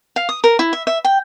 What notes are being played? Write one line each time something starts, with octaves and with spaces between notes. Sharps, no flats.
F5
D#6
A#4
E4
E5
E5
G5